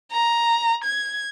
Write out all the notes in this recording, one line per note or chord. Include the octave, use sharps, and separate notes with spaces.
A#5
G#6